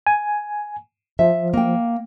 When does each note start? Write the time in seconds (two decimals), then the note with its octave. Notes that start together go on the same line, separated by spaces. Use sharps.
0.07 G#5
1.19 F3 E5
1.54 A#3 G5